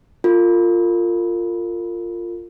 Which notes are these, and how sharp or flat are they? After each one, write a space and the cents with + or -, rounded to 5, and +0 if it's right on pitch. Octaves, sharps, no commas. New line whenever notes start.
F4 +0 A#4 -40